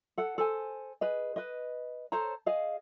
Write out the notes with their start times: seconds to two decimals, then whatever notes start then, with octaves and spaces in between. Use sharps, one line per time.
0.18 A4 F#5
0.38 A4 C5 G#5
1.01 G#4 B4 D#5
1.36 B4 D#5
2.12 A4 C5 C#5 A#5
2.46 G#4 D#5 F5